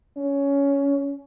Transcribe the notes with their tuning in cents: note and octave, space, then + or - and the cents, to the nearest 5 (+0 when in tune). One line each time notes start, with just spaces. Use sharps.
C#4 +15